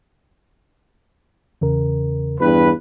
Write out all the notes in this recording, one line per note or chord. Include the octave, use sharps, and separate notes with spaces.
E2 C#3 A#4
E2 G2 B4